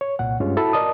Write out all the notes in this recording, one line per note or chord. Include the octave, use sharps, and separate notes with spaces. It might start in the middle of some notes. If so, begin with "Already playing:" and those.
C#5
C2 A#2 F#5
G2 G#3 C#4 F4
E4 F#4 A4 A5 B5
A#4 D5 D#5 A5 D#6